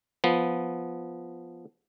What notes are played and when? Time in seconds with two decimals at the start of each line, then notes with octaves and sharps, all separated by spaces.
0.24 F3 B3